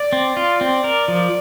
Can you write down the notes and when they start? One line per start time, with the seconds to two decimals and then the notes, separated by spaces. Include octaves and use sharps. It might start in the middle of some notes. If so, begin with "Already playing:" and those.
Already playing: D5
0.13 C4
0.37 F4
0.61 C4
0.84 A#4
1.08 F3